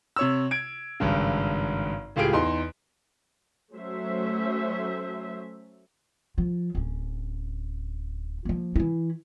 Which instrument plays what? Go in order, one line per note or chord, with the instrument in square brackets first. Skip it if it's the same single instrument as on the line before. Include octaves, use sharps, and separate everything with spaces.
[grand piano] C3 C#5 E6
G#6 D7
G#1 G2 C#3
C#2 A2 F4 G4 G#4 D7
E2 D#4 C6
[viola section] F#3 A3 C#4 C5 E5
[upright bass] F3
D1 C#4
F3 A#3
E3 E4